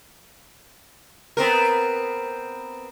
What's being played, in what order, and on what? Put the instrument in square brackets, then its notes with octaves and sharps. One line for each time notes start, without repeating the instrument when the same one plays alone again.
[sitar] B3 C4 A#4